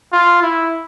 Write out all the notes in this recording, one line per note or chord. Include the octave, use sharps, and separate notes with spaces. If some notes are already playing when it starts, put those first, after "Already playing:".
F4
E4